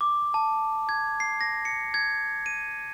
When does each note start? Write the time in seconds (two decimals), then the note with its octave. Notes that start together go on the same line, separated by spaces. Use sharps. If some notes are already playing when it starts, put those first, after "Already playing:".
0.01 D6
0.34 A5
0.89 G#6
1.20 C7
1.41 A#6
1.65 C#7
1.94 G#6
2.46 D#7